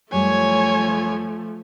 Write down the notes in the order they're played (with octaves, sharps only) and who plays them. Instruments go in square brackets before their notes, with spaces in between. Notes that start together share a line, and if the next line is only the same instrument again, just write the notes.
[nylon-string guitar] F#2 G3 [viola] F3 A3 [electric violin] C#5 G#5